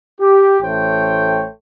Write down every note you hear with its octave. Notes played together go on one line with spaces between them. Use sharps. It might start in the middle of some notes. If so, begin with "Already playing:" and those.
G4
A1 A3 C5 C#5 G5